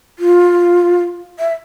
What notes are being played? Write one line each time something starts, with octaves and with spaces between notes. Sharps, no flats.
F4
E5